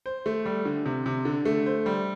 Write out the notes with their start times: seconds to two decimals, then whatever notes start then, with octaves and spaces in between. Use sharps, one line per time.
0.06 C5
0.26 A3
0.45 G3
0.65 D3
0.86 C3
1.06 C3
1.25 D3
1.46 A3
1.66 C5
1.86 G3